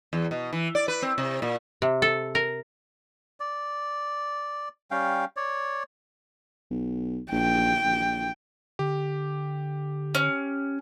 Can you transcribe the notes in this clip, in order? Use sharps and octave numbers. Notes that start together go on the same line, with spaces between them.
E2
B2
E3
D5
B4
C4
C3
A#2
C3
A4
A#4
D5
G3 C#4 F5 G5
C#5 D5
B1
A#1 G5
A#1
D3 G4
C#4